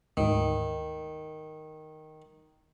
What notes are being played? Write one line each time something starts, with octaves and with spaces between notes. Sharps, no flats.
D2 G#2 D#3